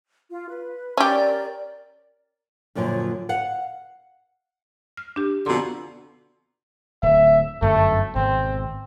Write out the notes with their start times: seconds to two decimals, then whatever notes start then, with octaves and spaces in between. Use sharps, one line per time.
0.30 F4
0.49 B4
0.97 C#4 G4 A#4 D5
2.75 F#2 A#2 D3 F3 F#3
3.29 F5 F#5
4.97 F6
5.16 D4 G4
5.46 F2 B2 D3 A#5 C6
7.03 D1 E5
7.62 G1 F#2 F#3 A3
8.15 G#1 B2 C4